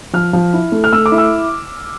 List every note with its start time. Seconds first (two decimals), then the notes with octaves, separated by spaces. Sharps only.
0.13 F3 F6
0.33 F3
0.53 E4
0.72 A3
0.84 F6
0.93 A3 E6
1.06 D6
1.12 E4
1.18 E6